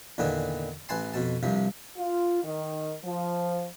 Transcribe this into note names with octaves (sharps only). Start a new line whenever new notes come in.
E2 A#2 D3 D#3 B3 D4
A1 B4 G#5 A5 C6
F2 B2 A5
C2 G2 C3 F3
F4
D#3
F3